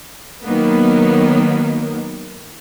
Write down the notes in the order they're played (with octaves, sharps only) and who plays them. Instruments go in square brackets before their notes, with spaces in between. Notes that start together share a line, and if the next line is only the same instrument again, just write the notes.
[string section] D#3 F#3 A#3 B3